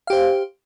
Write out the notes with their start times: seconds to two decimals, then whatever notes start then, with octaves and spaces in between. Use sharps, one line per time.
0.07 F5
0.10 G4
0.13 C5